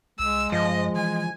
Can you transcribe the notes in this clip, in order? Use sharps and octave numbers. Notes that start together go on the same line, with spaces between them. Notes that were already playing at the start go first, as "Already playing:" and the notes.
C2 G#3 E6
G2 F3 D#5
E3 G#5